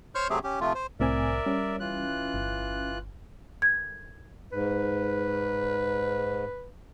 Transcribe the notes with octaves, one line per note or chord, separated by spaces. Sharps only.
C5 C#5 C6 C#6 F6 G6
C3 F#3 A3 C4 G4 G#4
C#4 G4
C3 F3 A3 F4
C5
C2 A2 C4 A#4 D5 E5 G#5
G3 C#4
E3 F4 F#6
G1
G#6
G#2 B4